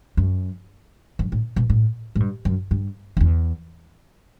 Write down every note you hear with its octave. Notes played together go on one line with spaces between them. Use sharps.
F#2
F#2
A2
B2
A2
A2
G2
F#2
G2
F#2
E2